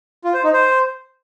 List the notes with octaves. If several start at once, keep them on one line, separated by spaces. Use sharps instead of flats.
F4
C5
D#4
C5